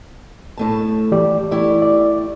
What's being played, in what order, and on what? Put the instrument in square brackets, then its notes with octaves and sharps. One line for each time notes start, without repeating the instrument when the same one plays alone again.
[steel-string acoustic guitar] A2 A3 A5
[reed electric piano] E3 G4 D5
[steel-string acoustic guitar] A3 E4 G4 [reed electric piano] D5
[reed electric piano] D5